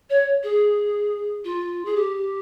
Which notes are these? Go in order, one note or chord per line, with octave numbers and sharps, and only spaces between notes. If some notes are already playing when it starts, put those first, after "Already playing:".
C#5
G#4
F4
G#4
G4